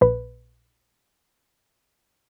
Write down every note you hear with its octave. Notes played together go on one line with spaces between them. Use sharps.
A#1 B4